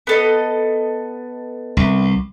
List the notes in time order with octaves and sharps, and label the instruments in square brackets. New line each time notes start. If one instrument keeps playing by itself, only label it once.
[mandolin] B3 A4 D#5
[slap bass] C2